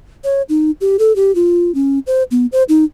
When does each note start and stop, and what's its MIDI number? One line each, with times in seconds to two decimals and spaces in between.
0.24 0.42 73
0.49 0.71 63
0.81 0.97 67
0.99 1.15 69
1.16 1.34 67
1.35 1.74 65
1.75 1.99 61
2.07 2.23 72
2.31 2.46 59
2.52 2.63 72
2.69 2.85 63